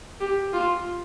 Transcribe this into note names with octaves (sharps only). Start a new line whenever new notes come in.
G4
F4